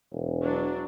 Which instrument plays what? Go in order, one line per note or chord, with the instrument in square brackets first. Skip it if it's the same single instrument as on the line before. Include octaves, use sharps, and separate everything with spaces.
[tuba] E1
[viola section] F#3 D4